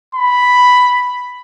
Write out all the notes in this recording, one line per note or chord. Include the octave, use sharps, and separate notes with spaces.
B5